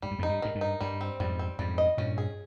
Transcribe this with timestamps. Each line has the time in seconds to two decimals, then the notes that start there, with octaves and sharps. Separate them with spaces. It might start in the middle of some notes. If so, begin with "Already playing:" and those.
0.02 G#2 G3
0.11 G2
0.19 F2 G#2
0.23 D#4
0.29 G2
0.42 G#2 D#3
0.55 G2
0.61 D#4
0.80 G2 G3
1.01 C4
1.20 F2 G#2 G3
1.39 C4
1.59 F2 G#2 G3
1.78 D#5
1.97 G2 A#2 C#4
2.18 G#4